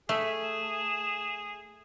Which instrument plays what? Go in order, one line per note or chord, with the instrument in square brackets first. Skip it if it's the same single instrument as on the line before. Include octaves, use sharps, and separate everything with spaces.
[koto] A3 [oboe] G#4 [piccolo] E5
[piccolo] E7